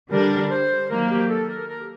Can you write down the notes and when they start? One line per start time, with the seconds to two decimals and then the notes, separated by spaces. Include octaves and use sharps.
0.11 D3 G3 D4 A#4
0.51 C5
0.90 D#3 F#3 A#3 A#4
1.10 G4
1.29 A4
1.49 A#4
1.68 A#4
1.80 G4